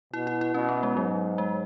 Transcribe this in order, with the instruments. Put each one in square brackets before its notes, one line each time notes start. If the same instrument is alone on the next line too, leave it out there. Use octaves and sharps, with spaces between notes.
[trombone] B2 [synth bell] E4
[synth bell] E4
E4
[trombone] B2 [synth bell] C#4
[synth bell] B3
G#3
[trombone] G#2 [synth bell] F#3
[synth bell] G#3